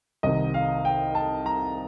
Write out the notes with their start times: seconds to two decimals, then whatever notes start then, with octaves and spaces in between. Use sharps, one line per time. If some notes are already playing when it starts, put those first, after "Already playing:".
0.23 C2 C3 D#3 D#5
0.54 F5
0.85 G5
1.15 A5
1.46 A#5